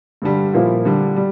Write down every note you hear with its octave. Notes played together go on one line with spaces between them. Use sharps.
G2 D3 G3
A#2 F3 A#3 E4
D3 G3 D4
G3